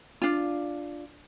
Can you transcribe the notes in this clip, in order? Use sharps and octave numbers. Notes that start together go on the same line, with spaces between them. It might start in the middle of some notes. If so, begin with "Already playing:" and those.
D4 F4